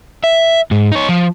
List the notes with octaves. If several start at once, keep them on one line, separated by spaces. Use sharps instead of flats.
E5
G#2
D#4 C#5
F3